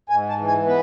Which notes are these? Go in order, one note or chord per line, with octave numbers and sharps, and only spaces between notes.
G#2 G#5
A5
E3
G#5
B3 B4